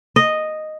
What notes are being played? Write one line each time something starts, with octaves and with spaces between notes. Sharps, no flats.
D#5